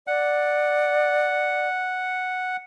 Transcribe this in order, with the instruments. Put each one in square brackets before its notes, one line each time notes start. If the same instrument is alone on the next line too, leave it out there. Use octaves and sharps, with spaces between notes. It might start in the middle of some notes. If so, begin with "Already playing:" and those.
[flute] D5 [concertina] F#5